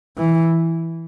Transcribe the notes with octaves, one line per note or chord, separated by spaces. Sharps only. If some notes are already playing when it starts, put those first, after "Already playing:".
E3